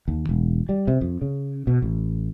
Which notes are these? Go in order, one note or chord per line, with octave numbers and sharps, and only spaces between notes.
D#2
E1
G3
C3
F2
C#3
B2
A1